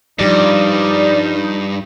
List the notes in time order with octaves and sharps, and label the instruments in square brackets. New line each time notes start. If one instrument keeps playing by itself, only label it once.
[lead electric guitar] G2 [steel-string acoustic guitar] F3 G3 D4 [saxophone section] D#4 [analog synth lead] D5